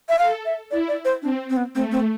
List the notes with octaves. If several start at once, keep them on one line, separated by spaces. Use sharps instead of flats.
E5
A4 F5
E5
E4 D5
D5
C5
C4 D4
C4
B3
A3 C4
C4